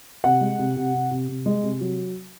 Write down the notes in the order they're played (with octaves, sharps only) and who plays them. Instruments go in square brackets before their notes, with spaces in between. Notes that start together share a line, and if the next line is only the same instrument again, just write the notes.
[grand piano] C3 F#5
G#3
C3
C3
C3
C3
C3
G#3
C3
F#3